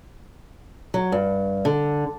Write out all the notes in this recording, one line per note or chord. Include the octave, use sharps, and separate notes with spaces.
F#3
G2
D3